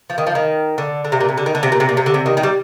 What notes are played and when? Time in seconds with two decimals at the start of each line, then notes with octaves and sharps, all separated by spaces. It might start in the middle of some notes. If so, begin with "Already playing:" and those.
0.10 F3
0.18 D#3
0.27 F3
0.35 D#3
0.78 D3
1.05 D3
1.12 C3
1.20 A#2
1.29 C3
1.38 D3
1.46 D#3
1.55 D3
1.63 C3
1.72 A#2
1.80 C3
1.89 A#2
1.97 C3
2.06 D3
2.14 C3
2.26 D#3
2.37 D#3
2.43 G3